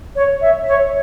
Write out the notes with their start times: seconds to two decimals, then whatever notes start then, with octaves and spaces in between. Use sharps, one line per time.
0.16 C#5
0.41 E5
0.67 C#5